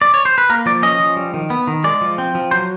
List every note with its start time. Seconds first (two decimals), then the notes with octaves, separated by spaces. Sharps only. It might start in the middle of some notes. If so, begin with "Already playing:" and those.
0.02 D5
0.14 C#5
0.25 C5
0.38 B4
0.49 A#3 A#4
0.66 F3 D5
0.82 C#4 D#5
1.00 F3
1.16 G3
1.34 D#3
1.50 B3
1.67 D#3
1.84 G#3 D5
2.01 F3
2.18 C4
2.35 F3
2.51 F#3 C5